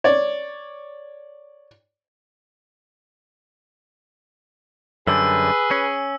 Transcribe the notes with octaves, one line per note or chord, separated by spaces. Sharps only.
C#5 D5
F#2 D3 G3 G#4 B4 E6
C#4